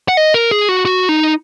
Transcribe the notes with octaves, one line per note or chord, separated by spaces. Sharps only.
F#5
D#5
A#4
G#4
F#4
F#4
D#4